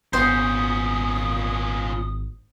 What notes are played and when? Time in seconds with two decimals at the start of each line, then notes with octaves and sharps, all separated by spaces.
0.13 G#1 A#2 B3 C#4 C5 D#6